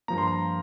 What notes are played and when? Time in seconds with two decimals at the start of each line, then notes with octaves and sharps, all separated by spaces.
0.08 G2 F3 A#3 A#5
0.18 C6
0.28 A#5